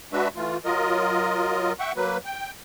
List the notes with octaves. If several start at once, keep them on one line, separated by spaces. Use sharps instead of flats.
G#3 D4 F#4 B4 E5
E3 A3 F4
F#3 F4 A#4 D#5
E5 F#5 G5 C#6
F#3 A#3 B4
G5